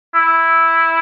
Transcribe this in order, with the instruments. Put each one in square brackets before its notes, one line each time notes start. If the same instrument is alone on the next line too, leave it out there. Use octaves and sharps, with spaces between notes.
[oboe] E4